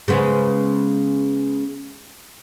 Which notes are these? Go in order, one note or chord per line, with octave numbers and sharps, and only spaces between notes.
C#3 G#3 B3